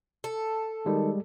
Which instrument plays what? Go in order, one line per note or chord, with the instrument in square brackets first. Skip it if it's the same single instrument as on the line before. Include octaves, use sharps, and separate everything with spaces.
[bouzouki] A4
[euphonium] D#3 [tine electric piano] G3 G#3